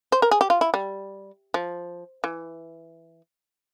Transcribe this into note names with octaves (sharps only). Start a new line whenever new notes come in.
C5
A#4
G#4
G4
F4
E4
G3
F3
E3